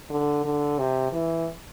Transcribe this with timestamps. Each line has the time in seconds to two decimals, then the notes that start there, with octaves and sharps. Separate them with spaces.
0.10 D3
0.45 D3
0.79 C3
1.12 E3